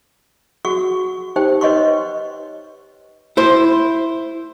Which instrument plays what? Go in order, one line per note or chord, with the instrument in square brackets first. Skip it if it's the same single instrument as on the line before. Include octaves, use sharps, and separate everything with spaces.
[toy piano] F#4 G#4 F#5 C#6
D#4 G4 C5 G5
B4 C#5 D#5 F#5 C6 C#6
[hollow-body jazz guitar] E4 C5